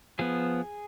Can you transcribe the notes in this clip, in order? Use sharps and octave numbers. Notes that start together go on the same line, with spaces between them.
F3 B3 G#4